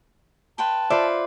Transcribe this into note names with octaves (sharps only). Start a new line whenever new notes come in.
B4 G5 A5 C6
F4 B4 C5 D5 E5